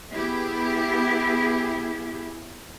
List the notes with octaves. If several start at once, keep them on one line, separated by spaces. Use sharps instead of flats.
B3 E4 G4 G#4